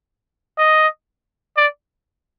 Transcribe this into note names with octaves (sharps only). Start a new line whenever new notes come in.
D#5
D5